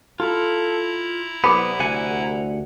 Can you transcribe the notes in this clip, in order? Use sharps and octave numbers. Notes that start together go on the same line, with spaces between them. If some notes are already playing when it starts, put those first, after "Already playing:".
E4 F4 A4 A#5
C2 B3 B5 D6
D2 F#5 G#5